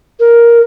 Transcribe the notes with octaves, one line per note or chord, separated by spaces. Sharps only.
A#4